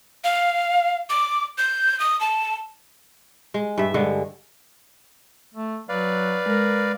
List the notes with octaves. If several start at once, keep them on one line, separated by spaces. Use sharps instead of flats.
F5
D6
G6
D#6
A5
G#3
G2 E5
G2 D3 G#3
A3
F#3 B4 D5 F5
G#3 A#4